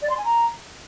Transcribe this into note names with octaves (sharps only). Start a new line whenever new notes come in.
D5
C6
G#5
A#5